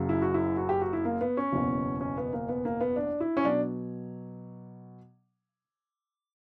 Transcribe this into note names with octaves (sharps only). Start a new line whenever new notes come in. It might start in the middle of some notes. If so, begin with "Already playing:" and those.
Already playing: F#1 F#2 C#3 F#3
E4
F#4
E4
F#4
G4
F#4
E4
A#3
B3
C#4
F#1 E2 B2
C#4
B3
A#3
B3
A#3
B3
D4
E4
C#4
B2 F#3 D4